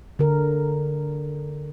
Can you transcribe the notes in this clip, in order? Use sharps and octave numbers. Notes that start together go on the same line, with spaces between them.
D3 A#4